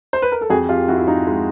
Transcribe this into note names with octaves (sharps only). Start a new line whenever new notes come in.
C5
B4
A#4
A4
F2 F#4 G#4
F2 F4 G4
F2 E4 F#4
E4
F2 D#4 F4
G#3